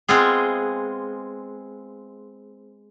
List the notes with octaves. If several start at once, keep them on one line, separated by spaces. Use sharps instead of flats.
G#3 B3 C4 F4 G#4